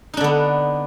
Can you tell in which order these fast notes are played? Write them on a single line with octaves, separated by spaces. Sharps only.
D#4 D4 D3 B3